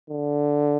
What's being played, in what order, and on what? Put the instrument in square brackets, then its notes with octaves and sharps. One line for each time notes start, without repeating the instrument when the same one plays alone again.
[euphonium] D3